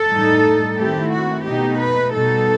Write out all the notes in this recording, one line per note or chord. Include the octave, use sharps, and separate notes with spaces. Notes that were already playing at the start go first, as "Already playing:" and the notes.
Already playing: A4
A2 G3 D#4
D#3 A3 C4 E4 G4
F#4
B2 A3 D#4 G4
B4
B2 G3 D#4 A4